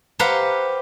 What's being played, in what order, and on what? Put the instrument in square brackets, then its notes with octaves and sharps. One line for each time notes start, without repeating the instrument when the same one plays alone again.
[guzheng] G4 B4 C5 F5 F#5 A#5